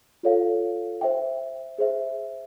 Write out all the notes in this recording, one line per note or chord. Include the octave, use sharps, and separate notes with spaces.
F4 A4 C#5 F5
C5 E5 G5
G#4 C5 E5